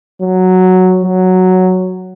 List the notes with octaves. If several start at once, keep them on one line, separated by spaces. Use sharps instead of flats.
F#3
F#3